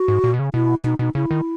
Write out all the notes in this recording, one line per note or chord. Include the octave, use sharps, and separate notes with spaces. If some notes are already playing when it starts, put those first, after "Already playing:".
Already playing: F#4
G#2
A#2
B2
C#3
B2 E4
B2 D#4
B2 D#4
C#3 E4
D#3